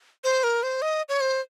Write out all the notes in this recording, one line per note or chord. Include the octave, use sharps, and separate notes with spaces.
C5
A#4
C5
D#5
C#5
C5